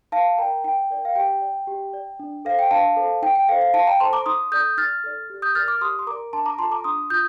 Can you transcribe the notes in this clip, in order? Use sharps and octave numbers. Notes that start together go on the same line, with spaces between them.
D#4 F5 A5
A#4 D5 G5 A#5
D#4 G5
A#4 D5
F5
G4 G5
D5
G4
D5
D4
A4 C5 F5
G5
D4 F5 A5
A4 C5
D#4 G5
G5
A4 C5 F5
F5
D#4 F5 A5
G5 A#5
A4 C5 A5 C6
A#5 D6
D#4 C6 D#6
A4 D5 D#6 G6
D#4 F6 A6
A4 D5
G4
D#6 G6
A#4 D5 F6 A6
D6 F6
G4 C6 D#6
C6
A#4 D5 A#5 D6
D4 A5 C6
A#5 D6
F4 A4 A5 C6
A#5 D6
D4 C6 D#6
F4 D#6 G6